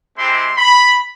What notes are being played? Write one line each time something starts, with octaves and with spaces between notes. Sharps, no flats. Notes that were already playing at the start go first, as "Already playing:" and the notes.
G#3 C4 E4 G4 C6
B5